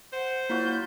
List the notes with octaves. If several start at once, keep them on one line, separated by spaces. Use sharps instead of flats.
C5 F#5
F#3 A#3 E4 F4 B5 G6